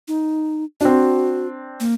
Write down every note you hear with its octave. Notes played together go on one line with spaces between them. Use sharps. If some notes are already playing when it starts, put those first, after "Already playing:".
D#4
C4 D4 F#4
A#3